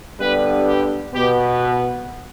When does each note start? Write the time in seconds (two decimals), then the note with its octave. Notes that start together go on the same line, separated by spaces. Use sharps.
0.19 G2 D3 G3 B3 B4
0.67 G4
1.14 B2 B3 G4